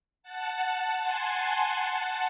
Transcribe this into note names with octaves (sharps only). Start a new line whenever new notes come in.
F#5 A5
F#5 A5
G#5 C6
G#5 C6
F#5 A5